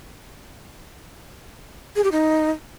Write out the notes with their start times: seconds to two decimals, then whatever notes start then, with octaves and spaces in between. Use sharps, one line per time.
1.96 G#4
2.04 G4
2.12 D#4